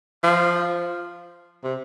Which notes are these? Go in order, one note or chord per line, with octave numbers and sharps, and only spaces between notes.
F3
C3